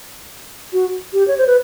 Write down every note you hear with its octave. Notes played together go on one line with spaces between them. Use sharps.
F#4
G4
C#5
C5
B4